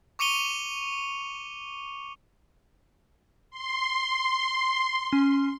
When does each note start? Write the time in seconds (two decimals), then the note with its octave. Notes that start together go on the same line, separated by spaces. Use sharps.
0.19 C#6 D6 C#7 D#7 F7 G7
3.51 C6
5.13 C#4